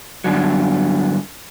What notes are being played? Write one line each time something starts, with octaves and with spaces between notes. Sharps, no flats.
G2 D3 F#3